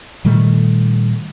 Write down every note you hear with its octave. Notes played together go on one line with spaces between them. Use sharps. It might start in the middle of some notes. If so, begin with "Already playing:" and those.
A#2 D#3 G3 A3